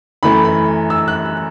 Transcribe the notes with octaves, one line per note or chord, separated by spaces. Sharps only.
F#2 E3 A3 B5
B5
E6
F#6